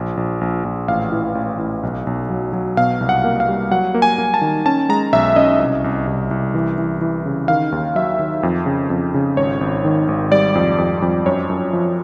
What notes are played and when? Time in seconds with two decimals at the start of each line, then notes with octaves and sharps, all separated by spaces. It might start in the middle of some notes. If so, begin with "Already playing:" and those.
Already playing: A#1
0.17 A#1
0.41 A#1
0.64 A#1
0.88 A1 F5
1.12 E3
1.35 A1
1.59 A1
1.83 B1
2.07 B1
2.30 F#3
2.53 F#3
2.77 B2 F5
3.01 C2
3.09 F#5
3.24 A#3
3.40 F5
3.48 G3
3.71 F#3 F#5
3.94 A#3
4.02 G#5
4.18 A#3
4.34 A5
4.41 D#3
4.66 C#4 A5
4.89 G#3 A#5
5.13 B1 E5
5.36 C#4 D#5
5.60 C2
5.84 C2
6.07 C2
6.31 C2
6.55 E3
6.78 E3
7.01 E3
7.25 C#3
7.48 D#3 F5
7.72 D#2
7.95 F#3 E5
8.19 D#3
8.43 F2
8.66 C#3
8.90 F2
9.14 C#3
9.37 G#1 C#5
9.61 G#1
9.85 D#3
10.08 G#1
10.31 G3 D5
10.55 F2
10.78 F2
11.02 F2
11.26 F#2 C#5
11.50 F#2
11.73 F3